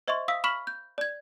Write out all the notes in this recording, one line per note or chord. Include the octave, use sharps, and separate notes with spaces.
C5 D#5 E5 C6 C#6
F5 D#6 E6 B6
B5 C#6 F6 B6 F#7
G6
D5 G#6